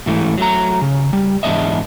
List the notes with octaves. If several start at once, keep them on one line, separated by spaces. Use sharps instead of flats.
G#2 E3 A3
F#3 A3 A#5
C#3
G3
E2 G#2 B3 D4 D#5 E5